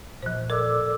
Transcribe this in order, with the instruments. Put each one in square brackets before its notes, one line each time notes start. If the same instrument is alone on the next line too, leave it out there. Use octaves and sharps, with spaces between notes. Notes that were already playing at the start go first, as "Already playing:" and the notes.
[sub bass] A#2 [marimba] F3 C5
[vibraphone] A4 D6 E6 [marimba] A#4 [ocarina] D5